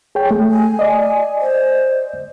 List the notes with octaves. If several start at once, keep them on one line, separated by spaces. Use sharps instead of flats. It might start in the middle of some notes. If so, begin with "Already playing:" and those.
G#4 C#5 G5
A3
G#5
D5 D#5
C5